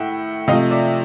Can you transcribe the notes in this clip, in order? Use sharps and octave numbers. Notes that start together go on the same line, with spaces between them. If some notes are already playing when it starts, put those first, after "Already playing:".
Already playing: A2 E5 F#5 G5
C3 F3 A3 D#5 F5
D5 E5